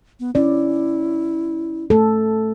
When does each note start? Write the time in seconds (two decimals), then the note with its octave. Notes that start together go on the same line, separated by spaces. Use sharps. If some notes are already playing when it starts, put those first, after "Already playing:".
0.20 B3
0.35 C#4 E4 D5
1.90 A3 A4